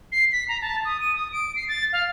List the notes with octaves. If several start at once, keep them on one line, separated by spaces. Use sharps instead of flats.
C7
B6
A#5
A5
D#6
D#7
D#6
D7
C7
A6
F5